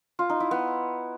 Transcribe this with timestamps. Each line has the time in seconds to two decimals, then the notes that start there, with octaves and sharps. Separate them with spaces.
0.19 F4
0.30 D#4
0.40 E4
0.51 B3